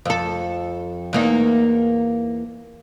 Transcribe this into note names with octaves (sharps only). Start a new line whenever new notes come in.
F2 A4
E2 A#3 D#4